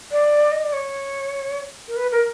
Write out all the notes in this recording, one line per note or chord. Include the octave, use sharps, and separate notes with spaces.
D5
D#5
D5
C#5
A#4
B4
A#4